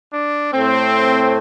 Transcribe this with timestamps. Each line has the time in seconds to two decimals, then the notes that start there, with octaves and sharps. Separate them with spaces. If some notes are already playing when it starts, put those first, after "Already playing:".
0.13 D4
0.53 A2 A3 C4